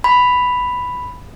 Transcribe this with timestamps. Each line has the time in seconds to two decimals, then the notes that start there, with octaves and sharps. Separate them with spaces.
0.04 B5